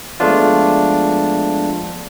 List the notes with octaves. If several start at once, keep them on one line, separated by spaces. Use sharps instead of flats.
F3 G#3 A3 B3 D4 F4